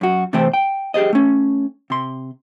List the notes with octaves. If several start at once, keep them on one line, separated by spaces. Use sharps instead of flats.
F#2 F#4
C3 E3 A3 C4 C5 G5
G5
G4 G#4 C5 D#5
A3 C#4
C3 C6